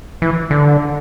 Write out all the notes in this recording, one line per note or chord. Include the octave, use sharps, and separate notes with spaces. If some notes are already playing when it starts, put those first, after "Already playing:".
E3
D3